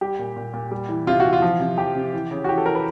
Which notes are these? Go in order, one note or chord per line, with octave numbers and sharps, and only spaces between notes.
G3 G4
A#2
A#2
A#2
G3
E3
C3 F4
F#4
E3
F4
F3
C3
F3 G4
C3
E3
C#3
F#4
E3 G4
A4
E3 A#4
B4